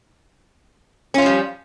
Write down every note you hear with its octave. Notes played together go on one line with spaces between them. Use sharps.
F3 G3 C#4 F4